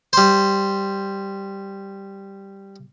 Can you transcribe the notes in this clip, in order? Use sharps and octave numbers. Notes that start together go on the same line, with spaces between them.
G3 C5